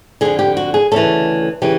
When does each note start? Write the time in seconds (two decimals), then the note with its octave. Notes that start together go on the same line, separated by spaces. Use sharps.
0.21 F2 D3 G#4
0.39 G4
0.57 F#4
0.74 G#4
0.91 D2 C#3 E3 A4
1.62 C#3 E3 G4